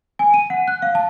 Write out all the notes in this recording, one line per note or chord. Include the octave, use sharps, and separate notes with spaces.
G#5
D#7
F#5
F#6
F5
A5